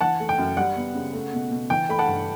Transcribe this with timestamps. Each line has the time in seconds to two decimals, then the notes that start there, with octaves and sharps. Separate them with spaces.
0.01 E3 F#5 A5
0.20 A3
0.29 G5
0.38 F#2
0.57 G3 F#5
0.76 B3
0.95 C#3
1.13 A3
1.33 B2
1.51 B2
1.70 E3 G5
1.89 A3 B5
1.99 F#5 A5
2.08 G2